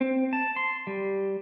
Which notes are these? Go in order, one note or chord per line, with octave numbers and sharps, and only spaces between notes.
C4
A5
C6
G3